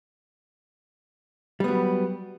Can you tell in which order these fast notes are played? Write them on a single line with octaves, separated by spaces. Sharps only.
G3 B3 F#3